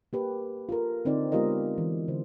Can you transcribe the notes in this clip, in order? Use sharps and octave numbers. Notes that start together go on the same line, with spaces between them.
A#3 G4 B4
F4 A4 A#4
D3 C4 D#4 C5 D5
G#3 B3 F4 G4 A#4 D#5
E3
D3 C5